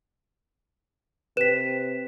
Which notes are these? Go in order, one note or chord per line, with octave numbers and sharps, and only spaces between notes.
C3 B4 B6 E7